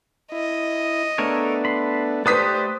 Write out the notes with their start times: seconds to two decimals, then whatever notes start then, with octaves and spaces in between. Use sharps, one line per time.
0.32 E4 D#5
1.18 A3 B3 D4 A4 A#4 C#5
1.65 B5 C6
2.26 A3 G4 A4 B4 C5 D5 D#6 B6